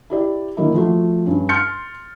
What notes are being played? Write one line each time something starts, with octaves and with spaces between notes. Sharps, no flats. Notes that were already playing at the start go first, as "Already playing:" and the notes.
E4 G4 D5
D3 D#3 F#3 A#3 D#4 E4
F3 A3 F#4
G2 C#4
C6 F6 G6 A6 C#7